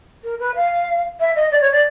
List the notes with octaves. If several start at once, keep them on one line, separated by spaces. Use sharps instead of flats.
A#4
B4
F5
E5
D#5
D5
C#5
D5